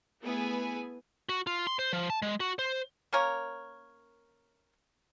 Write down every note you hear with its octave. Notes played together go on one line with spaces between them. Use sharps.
A3 B3 E4 G#4 B4 G#5
F#4
F4
C6
C5
F3
A5
G#3
F#4
C5
A#3 C#4 A#4 C#5